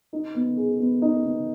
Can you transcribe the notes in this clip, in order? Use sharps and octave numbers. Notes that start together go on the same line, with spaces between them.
D#4
B3
G#4
B3
D#4
B3